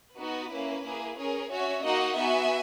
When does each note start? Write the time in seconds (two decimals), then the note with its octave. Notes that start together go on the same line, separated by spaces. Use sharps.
0.18 B3 D#4 F#4 B4
0.52 A#3 C#4 E4
0.85 A#3 E4 G#4
1.18 C#4 G#4 A#4 C#5
1.51 C#4 F#4 C#5 E5
1.85 A#3 D#4 F#4 D#5 F#5
2.18 B3 F#4 E5 G#5